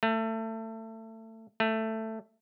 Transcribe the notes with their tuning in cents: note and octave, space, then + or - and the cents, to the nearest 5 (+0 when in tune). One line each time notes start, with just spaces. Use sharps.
A3 +25
A3 +10